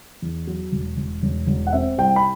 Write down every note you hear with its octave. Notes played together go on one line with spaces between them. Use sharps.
E2
F#3
E1
E1
E1
E1
F#5
C4 E5
C2 G5
B5